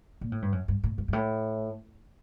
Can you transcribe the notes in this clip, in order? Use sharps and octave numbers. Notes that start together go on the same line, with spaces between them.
A#2
A2
G2
F#2
G2
A2
G2
G2
A2